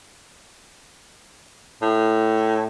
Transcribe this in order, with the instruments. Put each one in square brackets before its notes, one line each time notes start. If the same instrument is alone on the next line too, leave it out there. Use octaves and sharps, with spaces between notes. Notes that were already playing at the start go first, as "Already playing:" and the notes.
[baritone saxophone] A2